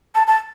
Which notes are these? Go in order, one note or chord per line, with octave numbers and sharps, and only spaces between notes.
A5
A5